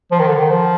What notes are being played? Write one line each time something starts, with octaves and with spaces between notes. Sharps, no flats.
F3
D#3
D3
D#3
F3